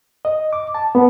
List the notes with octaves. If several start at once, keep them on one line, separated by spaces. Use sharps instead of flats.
D#5
D6
A5
B3